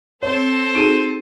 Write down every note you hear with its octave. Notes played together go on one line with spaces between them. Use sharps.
C4 A4 C5 C#5
D#4 F#4 G#4 D7 D#7